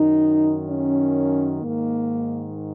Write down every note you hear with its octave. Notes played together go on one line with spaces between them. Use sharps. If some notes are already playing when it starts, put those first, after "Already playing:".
Already playing: F#2 D#3 D#4
C#4
G#2 D#3 A#3